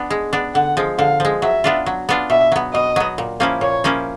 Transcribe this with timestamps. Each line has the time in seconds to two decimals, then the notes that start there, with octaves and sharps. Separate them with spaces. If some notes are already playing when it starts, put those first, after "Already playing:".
Already playing: B3 D4
0.10 G#3
0.33 B3 D4
0.54 D3 F#5
0.77 F3 G#3
0.98 D3 F5
1.20 F3 G#3
1.42 F#3 E5
1.64 B3 D4 F4
1.86 F#3
2.09 B3 D4 F4
2.30 B2 E5
2.52 F#3 B3
2.73 B2 D#5
2.96 F#3 B3
3.18 A#2
3.40 F3 A#3 C#4 E4
3.61 A#2 C#5
3.84 F3 A#3 C#4 E4